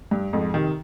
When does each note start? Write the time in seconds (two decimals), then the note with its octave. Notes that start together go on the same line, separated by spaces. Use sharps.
0.11 G2
0.33 F2 G#2
0.54 C3 D#3